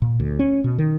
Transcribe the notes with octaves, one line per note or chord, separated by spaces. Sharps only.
A#2
D2
C#4
B2
D#3